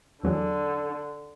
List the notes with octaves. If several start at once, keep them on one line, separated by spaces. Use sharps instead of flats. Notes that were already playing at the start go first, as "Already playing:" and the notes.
E2 D3 F#3 G#4